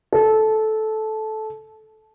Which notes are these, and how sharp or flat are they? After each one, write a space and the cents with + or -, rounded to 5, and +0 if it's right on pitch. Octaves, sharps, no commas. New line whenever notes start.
A4 -15